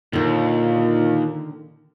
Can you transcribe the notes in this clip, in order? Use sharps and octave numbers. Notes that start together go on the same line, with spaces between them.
D#2 A#2 D3 D#3